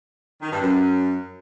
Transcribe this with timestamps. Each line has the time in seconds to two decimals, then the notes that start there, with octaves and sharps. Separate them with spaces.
0.41 D#3
0.51 G2
0.62 F#2